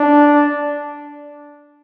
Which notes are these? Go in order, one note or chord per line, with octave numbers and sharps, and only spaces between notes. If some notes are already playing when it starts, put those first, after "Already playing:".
Already playing: D4